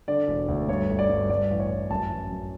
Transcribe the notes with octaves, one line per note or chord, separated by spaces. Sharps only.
D3 D5
E1
D2
G2 C#5
G1
D5
G2
G2 D5
A1
C#5
A1
F#2 A5
E3
F#2